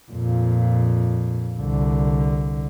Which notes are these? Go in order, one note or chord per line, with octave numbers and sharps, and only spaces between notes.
F2 A#2
C2 D3